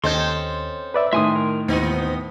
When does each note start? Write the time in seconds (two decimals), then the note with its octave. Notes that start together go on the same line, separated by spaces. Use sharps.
0.04 D#2 C4 C#4 A4 D#5 C6 G6
0.94 B4 D5 E5
1.13 A2 D#3 E5 G#5 C6 D#6
1.35 A#4
1.68 D#2 E3 B3 C4 D#4